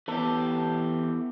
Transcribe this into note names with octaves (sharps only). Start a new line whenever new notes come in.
E3 B3 G4 A4